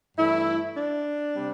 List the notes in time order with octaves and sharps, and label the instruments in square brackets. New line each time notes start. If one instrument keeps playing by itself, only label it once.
[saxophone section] G2 E3 A3 E4
D4
C3 G3 C4